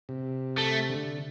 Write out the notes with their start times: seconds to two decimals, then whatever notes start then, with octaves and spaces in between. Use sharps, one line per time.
0.09 C3
0.58 A3
0.90 D3